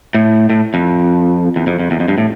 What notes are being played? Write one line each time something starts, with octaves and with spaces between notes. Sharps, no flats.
A2
A2
F2
E2
F2
F2
E2
F2
G2
A2